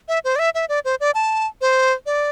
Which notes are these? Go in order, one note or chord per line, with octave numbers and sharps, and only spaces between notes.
E5
C5
D5
E5
E5
D5
C5
D5
A5
C5
D5